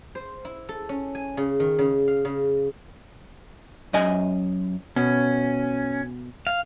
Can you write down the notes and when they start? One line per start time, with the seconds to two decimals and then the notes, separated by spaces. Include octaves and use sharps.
0.15 C5
0.45 E4
0.69 A4
0.89 C#4
1.15 G#5
1.37 C#3
1.60 D#3
1.79 C#3
2.08 F5
2.25 C#3
3.93 F#2 D#5 G#5
4.96 B2 C#4
6.47 F5